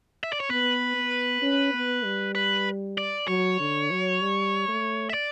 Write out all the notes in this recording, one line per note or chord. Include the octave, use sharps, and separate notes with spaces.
E5
D5
C#5
B3 B4
B3
C#4
B3
G3
B4
D5
F#3 C#5
D3
F#3
G3
A3
E5
D5